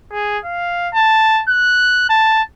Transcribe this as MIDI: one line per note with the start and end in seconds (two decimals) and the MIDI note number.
0.12 0.38 68
0.45 0.89 77
0.94 1.43 81
1.48 2.05 90
2.10 2.42 81